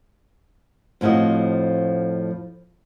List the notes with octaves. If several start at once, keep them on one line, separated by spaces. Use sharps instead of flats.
F2 A2 F3 F#4 D#5